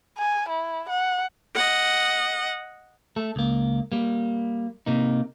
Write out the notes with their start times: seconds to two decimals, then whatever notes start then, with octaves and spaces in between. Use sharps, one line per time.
0.18 G#5
0.49 E4
0.90 F#5
1.55 D#5 F#5
3.16 A3 A4
3.36 C#2 A#3
3.92 G3 A#3
4.86 C3 A#3 D#4